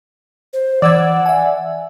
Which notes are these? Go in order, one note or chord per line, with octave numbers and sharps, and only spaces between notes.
C5
E3 D5 F#5 E6 G#6
E5 G#5